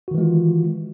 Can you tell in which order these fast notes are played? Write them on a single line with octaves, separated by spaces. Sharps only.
F#4 D#3 E3 G#3 F4